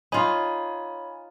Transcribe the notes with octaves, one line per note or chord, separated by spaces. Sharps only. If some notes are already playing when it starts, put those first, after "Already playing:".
D#4 F4 C#5 G#5 B5